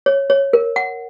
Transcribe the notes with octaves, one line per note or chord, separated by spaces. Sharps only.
C#5
C#5
A#4
F#5